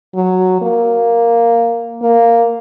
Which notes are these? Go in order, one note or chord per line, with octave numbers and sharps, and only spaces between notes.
F#3
A#3
A#3